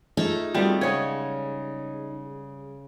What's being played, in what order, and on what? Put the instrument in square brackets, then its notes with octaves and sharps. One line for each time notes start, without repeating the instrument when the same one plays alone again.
[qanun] A3 [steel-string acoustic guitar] D#4 [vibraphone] F4 G#4 E5
[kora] G3 [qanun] A3 B3 [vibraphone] C4 F4 F#4
[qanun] C#3 G#3 [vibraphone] G#4 [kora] C#5